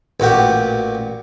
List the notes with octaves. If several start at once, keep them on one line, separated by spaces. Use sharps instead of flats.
A1 A#2 F#4 G4